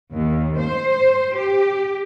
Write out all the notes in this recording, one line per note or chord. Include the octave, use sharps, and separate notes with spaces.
D#2
C5
G4